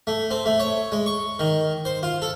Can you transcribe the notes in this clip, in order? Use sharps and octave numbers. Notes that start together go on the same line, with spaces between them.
A3
C4
A3
C#5
G#3
C#6
D#3
C5
F4
A4